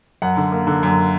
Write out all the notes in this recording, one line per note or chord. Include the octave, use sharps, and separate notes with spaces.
F#2 F#5
D3
A#3
D3
F#2